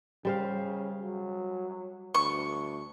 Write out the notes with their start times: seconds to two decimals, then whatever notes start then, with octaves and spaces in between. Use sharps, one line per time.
0.25 C#3 G3 C5 F5
1.02 F#3
2.14 D2 C#6